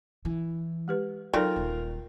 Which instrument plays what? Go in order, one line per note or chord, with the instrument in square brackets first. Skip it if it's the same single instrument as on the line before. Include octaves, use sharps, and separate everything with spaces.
[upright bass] E3
[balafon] G#3 G4 B4
[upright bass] F#3 [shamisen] C4 [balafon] D#4 A4 D5 [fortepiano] F4 A#4
[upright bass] D#1